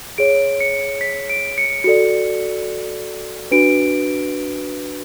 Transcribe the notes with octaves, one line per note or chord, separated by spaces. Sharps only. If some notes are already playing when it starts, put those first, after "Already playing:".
G#4 C#5 D7
C#7
B6
D7
C#7
F#4 A4 D5 C#7
D4 F#4 B4 D7